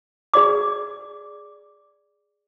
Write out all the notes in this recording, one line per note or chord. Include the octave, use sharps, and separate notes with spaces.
G#4 D5 D6